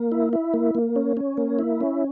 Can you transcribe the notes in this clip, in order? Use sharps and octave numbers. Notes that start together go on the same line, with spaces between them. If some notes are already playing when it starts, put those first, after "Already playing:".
Already playing: A#3
E4
E4
A#3
A#3
C#4
C#4
A#3
E4
C#4